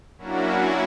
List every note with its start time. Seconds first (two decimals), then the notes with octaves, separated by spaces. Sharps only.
0.18 F#3 A#3 C#4 D4 E4 F#4